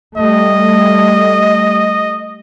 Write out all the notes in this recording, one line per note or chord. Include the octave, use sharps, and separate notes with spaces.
G3 A3 D#5